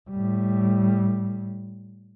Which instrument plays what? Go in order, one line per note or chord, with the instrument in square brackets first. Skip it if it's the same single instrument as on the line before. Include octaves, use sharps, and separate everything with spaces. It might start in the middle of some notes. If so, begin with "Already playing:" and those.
[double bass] A2 G3